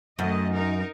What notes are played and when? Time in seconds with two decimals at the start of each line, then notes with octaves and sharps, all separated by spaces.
0.19 F#2 D#3 A3 D#5
0.53 D#4 A#4